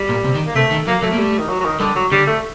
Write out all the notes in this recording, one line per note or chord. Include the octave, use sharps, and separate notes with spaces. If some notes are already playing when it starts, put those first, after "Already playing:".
Already playing: G3
A#2
C3
D#3
A#3
C3 A3
D#3
F#3 A#3
F#3 A3
A#3
G3 A3
D#3
F#3
F#3
D#3
D3 G3
F#3
D3 G3
A3